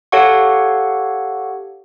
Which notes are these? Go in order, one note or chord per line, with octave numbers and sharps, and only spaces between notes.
G4 A4 C#5 F5 F#5 C#6